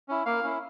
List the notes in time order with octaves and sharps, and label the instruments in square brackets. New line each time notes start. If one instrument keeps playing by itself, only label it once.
[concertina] C#4 E4
A#3 F5
C#4 E4